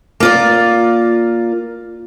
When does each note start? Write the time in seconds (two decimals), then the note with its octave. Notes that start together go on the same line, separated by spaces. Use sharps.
0.20 A#3 F4 D5